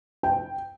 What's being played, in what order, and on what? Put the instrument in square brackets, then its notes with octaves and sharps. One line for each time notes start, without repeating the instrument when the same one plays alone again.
[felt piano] G5